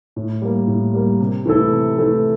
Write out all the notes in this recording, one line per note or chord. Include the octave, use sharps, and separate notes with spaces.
A2
G3 A#3
A2
G3 A#3
C3
E3 A3 E4 A4
C3
E3 A3 E4 A4